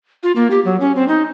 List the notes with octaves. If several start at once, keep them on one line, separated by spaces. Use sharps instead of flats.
F4
A#3
G4
F#3
C#4
C4
D#4